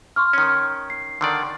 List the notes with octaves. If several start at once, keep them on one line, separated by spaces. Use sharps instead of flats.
C6 C#6 F6
D#3 C#4
C7
D3 D#3 D5